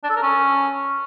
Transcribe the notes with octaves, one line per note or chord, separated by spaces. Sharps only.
D4
A4
A#4
C#4